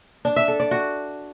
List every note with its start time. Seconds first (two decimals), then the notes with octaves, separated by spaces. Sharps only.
0.25 D4
0.36 E5
0.48 A4
0.60 D5
0.71 F#4